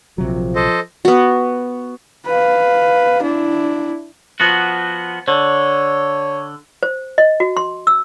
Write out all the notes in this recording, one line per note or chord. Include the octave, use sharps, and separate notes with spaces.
A#1 C3 F3 F#3
A4 C5 D#5
B3 F#4
B4 F5
D4 E4
F3 B3 F#4
D3 C#5
C5
D#5
F#4
C6
E6